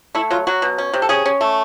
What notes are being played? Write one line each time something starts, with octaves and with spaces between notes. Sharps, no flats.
A3 E4
F#3 F4
F#3 F#4
B2
C#4
C3
A4
C#4 G#4
C#4
A3